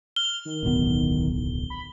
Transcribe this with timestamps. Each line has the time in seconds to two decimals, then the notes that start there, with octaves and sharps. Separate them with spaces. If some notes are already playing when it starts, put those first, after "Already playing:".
0.16 F6 G7
0.45 D#3
0.63 D1 B1 B3
1.70 B5